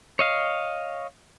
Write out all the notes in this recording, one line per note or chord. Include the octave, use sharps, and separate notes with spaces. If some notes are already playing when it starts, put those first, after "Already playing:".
C#5 D#5 F5